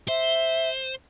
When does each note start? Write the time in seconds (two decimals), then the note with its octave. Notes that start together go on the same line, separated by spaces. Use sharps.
0.08 C5 E5